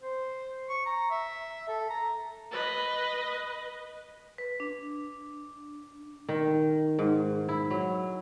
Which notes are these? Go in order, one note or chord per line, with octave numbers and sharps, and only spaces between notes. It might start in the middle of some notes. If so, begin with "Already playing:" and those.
C5
C#6
A#5
E5
A4
A#5
B4 D#5
B4
D4
D#3
G#2
E4
F#3